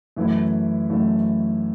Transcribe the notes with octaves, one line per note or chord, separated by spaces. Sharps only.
F#2 E3 A3 E4
F#2 E3 A3 E4